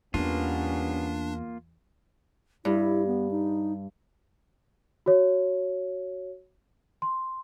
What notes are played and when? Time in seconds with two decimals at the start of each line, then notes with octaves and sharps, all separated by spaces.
0.14 E2 G3 A#3 B3 C#4 D4 F4
2.65 G2 E4
3.07 B3
3.31 D#4
5.06 F#4 C#5
7.02 C6